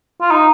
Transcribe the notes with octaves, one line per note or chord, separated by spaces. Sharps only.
F4
D#4